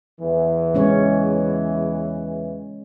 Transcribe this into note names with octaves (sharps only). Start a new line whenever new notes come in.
E2 E3
G#3 C#4 C#5